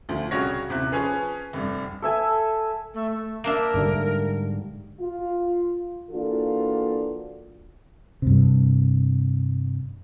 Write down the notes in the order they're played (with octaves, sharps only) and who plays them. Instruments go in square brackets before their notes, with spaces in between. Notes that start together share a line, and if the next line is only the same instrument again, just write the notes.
[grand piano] D2 F3
C2 C#3 F#4 C#5 A#6
D#1 C3 E4 F#6
F3 C#4 G#4 B4
F1 G2
[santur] A4 E5 G#5
[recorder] A3
A3
[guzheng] A#3 D4 E5 [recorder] A#4
[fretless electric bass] G#2 D3 G3
[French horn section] F4
E3 A#3 D4 F4 F#4 A4
[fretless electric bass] G2 C3